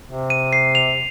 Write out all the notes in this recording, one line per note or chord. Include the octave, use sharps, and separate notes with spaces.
C3
D#7
C7
F7